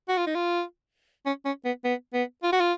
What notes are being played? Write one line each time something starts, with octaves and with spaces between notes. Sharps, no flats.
F#4
F4
D#4
F4
C#4
C#4
B3
B3
B3
F4
F#4
F4